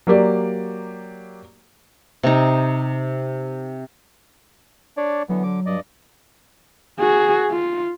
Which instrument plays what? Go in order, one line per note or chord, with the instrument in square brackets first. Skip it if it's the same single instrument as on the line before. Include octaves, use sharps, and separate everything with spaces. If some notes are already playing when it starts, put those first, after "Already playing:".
[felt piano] F#3 A#3 G4 D5
[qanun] C3 D#4
[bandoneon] D4 C#5 D5
[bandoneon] D3 E3 B3 [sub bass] F#3
[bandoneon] D3 D6
G2 D5 D#5
[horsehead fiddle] F#4 G#4
F4